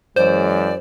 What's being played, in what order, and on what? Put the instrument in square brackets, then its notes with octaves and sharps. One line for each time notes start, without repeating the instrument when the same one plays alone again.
[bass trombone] F#2 [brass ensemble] E3 F#3 G#3 [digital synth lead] C5 [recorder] D5